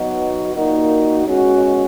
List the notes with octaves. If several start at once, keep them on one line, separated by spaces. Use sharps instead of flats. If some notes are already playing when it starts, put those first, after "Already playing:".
Already playing: B2 F#3 B3 D#4 F#4
A#2 A#3 D#4 F#4
B2 G#3 C#4 F#4